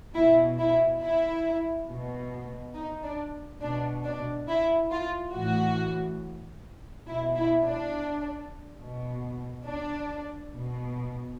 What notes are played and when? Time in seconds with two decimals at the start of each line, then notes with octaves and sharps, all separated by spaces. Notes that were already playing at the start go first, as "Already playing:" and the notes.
0.15 B2 E4
0.58 E4
1.02 E4
1.88 B2
2.75 D#4
3.03 D4
3.61 B2 D4
4.05 D4
4.48 E4
4.91 F4
5.34 A2 E3 F#4
7.07 B2 E4
7.36 E4
7.65 D4
8.80 B2
9.67 D4
10.54 B2